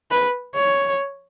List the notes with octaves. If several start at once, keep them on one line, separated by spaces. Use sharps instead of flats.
B4
C#5